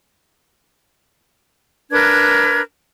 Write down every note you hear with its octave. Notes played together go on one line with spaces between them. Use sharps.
D4 A#4 B4 G#6